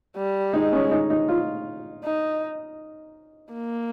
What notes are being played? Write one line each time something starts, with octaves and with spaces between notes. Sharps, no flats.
G3
G#3 D#4
C#4
D#4
D#4
F4
D#4
A#3